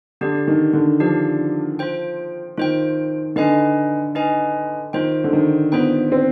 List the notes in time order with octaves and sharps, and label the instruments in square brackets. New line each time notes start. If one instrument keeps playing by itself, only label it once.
[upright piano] D3 [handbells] D4 G4 D5
[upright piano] D#3
D3
[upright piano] F3 [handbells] D4 G4 D5
[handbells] F4 C5 G5
[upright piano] D#3 [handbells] F4 C5 G5
[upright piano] D3 [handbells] D#4 B4 D#5 G#5
[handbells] D#4 B4 D#5 G#5
[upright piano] D#3 [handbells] F4 C5 G5
[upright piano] D3
D#3
[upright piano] B3 [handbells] F4 C5 G5
[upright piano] C4